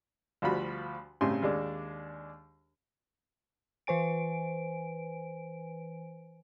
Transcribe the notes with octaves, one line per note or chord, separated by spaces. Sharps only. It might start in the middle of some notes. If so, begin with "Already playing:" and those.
D2 F3 G3 F#4 B5
A2 C#3 G3 C4 G#5 C6
D#2 G#3 D4
E3 B4 C5 G#5 D7